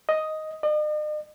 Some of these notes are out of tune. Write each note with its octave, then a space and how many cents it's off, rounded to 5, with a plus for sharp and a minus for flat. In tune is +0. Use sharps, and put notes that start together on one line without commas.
D#5 +5
D#5 -45